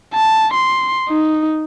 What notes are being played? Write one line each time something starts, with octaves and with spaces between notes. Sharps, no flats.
A5
C6
D#4